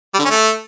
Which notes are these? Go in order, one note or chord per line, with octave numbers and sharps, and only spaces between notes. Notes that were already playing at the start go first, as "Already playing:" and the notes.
G3
D3
C#4
A3